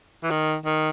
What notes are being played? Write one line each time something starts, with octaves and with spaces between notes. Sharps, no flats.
E3
D#3
D#3